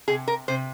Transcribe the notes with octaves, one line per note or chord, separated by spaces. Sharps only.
C3 G#4
A#4
C3 C5